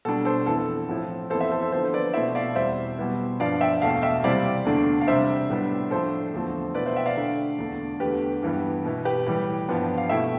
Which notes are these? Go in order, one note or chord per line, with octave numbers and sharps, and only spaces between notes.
B2 G3 D4 A4
A4 C5
F2 E3 B3 E4 A4
A2 F3 C4 E4
F2 E3 B3 E4 A4 C5
C5 E5
A4 C5
A4 C5
D3 F3 B3 A4 C5
C5
B4 D5
B2 A3 C4 E4 C5 E5
D5 F5
E2 B2 G3 C4 E4 C5 E5
B2 G3 B3 E4
G2 F3 B3 D4 D5 F5
E5 G5
E2 B2 A3 F5 A5
E5 G5
C3 G3 C4 E4 D5 F5
E2 D3 A3 D4
F5
C3 G3 D4 C5 E5
A2 G3 B3 D4
A2 F3 A3 D4 A4 C5
E2 D3 F3 A3 C4
B2 B3 E4 B4 D5
C5 E5
E5 G5
D5 F5
D3 A3 D4
E2 D3 A3 D4
E2 D3 A3 G4 B4
G2 E3 G3 B3
B2 B3 E4
G4 B4
A2 E3 G3
G2 F3 B3 D4
F5
B2 A3 E4 E5 G5